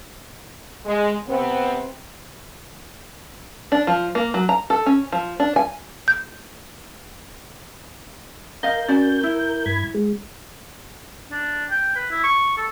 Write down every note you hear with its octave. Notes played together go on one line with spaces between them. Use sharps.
G#3
C3 B3 C4
D4
F3
A#3
F#3
A#5
A4
C#4
F3
D4
G#5
G6
A#4 D#5 F5 G6
C#4 F#4 D5
E4
G2 B5 G#6
G#3
D4
G5
B4
E4
C#6
A4